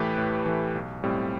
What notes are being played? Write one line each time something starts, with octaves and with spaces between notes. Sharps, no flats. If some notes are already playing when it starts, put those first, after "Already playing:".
Already playing: A2 E3 A3 G4 B4
A2
E3 A3
B1
A2 G3 C4